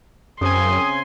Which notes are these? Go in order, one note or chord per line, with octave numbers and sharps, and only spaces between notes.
F#2 C#3 C4 G#5 C6 D#6